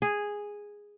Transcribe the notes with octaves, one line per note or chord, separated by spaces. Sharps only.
G#4